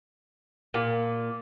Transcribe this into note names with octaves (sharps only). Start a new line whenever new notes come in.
A#2